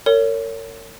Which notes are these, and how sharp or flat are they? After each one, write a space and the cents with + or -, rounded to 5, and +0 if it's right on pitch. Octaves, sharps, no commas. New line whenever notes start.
A#4 -40 C#5 +15